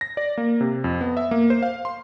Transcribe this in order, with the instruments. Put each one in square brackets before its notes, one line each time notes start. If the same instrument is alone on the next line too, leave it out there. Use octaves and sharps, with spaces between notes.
[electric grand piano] A#6
D5
A#3
C3
F2
B3
E5
A#3
C5
F5
C6